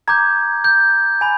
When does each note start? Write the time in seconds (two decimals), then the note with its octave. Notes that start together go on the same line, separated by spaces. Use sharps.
0.08 A#5 D6 G6 G#6
0.64 G6
1.21 G#5 B5